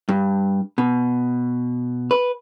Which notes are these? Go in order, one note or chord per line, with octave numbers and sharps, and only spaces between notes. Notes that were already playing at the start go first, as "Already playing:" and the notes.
G2
B2
B4